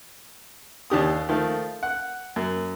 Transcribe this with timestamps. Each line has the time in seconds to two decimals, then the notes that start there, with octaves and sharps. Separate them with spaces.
0.90 D#2 D4 G4 D#6
1.29 D#3 F3 A3
1.83 F#5
2.36 F#2